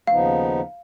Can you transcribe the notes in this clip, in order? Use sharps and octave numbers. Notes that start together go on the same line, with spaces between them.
D#2 C#3 F3 B3 D#4 F5